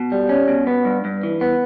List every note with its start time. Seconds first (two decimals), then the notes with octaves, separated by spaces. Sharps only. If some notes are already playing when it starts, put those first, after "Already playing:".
Already playing: B2
0.12 G3
0.29 C#4
0.48 B2
0.67 B3
0.85 G2
1.05 G2
1.23 E3
1.41 B3